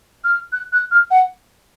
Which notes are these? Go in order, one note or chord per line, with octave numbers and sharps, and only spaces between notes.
F6
F#6
F#6
F6
F#5